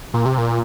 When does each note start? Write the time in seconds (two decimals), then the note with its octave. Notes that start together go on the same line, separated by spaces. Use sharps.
0.14 A#2
0.25 C3
0.38 A#2